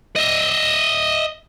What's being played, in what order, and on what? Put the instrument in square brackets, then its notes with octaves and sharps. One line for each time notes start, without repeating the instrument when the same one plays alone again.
[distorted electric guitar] D#5 E5